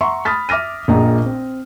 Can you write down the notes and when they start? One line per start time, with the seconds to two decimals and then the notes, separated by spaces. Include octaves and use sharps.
0.01 E5 F#5 A#5 C6 C#6
0.25 B5 D#6 F6 A6 B6
0.49 E5 D6 F6 A#6 D#7
0.88 A#1 A#2 G#4 D#5 A#5
1.26 C4